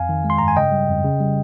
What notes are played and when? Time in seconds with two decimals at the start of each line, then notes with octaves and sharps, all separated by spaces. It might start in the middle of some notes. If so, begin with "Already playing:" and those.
Already playing: F2 F5 G#5
0.09 D#3
0.24 G#3
0.30 C6
0.38 G2 A#5
0.48 G#5
0.56 C#3 D#5 G5
0.72 G3
0.88 F2
1.04 C#3
1.20 G3